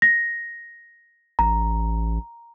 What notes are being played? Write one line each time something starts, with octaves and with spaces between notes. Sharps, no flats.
A#6
A1 A#5